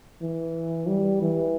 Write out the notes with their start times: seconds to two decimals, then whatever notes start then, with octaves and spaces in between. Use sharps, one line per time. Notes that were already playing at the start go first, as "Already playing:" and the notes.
0.21 E3
0.88 G3
1.22 E3